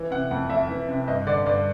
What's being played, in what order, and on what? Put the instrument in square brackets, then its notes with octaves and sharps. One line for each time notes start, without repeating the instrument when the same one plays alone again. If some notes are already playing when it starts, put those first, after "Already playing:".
Already playing: [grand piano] E3
C3 F#5
F2 F#5
F2 E5
E3
C3
G2 D#5
D3 D5
G2 D5